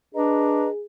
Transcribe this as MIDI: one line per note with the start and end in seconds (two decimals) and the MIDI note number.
0.15 0.68 62
0.15 0.84 68
0.15 0.68 71
0.15 0.68 75
0.15 0.68 82